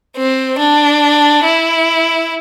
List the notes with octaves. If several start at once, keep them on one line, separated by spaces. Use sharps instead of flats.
C4
D4
E4